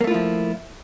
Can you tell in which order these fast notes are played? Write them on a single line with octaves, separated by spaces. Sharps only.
A#3 A3 F4 E4 F3